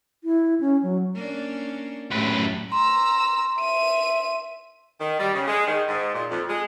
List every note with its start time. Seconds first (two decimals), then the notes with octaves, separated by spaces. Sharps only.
0.24 E4
0.60 C#4
0.83 F#3
1.15 A#3 C#4 D4
2.11 F#2 A2 A3 G4 B4
2.72 A#5 C6 E6
3.60 E5 D#7
5.00 D#3
5.19 G3
5.34 C#3
5.47 G#3
5.67 D#3
5.88 G#2
6.14 A#2
6.31 F2
6.48 G#3